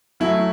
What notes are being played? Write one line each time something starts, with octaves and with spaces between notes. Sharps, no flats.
F#2 F#3 A3 E4